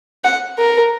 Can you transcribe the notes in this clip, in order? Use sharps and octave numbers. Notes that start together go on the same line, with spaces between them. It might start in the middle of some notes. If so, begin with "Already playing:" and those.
F#5
A#4